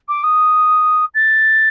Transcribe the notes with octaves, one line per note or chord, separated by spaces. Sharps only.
D6
D#6
A6